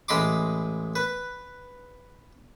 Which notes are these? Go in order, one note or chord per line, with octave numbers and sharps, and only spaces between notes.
A1 G#3 D#5 B5 C6 D6
B4